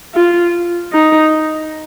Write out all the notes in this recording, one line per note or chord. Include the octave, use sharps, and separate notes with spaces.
F4
D#4